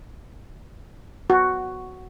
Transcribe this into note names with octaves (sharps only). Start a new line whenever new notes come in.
F#4